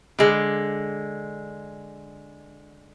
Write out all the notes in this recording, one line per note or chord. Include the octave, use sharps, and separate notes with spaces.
D3 G#3